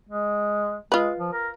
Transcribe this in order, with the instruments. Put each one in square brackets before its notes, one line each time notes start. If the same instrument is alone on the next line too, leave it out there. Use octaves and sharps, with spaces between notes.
[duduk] G#3
[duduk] G#3 [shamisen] F4 B4
[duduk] F3
A#4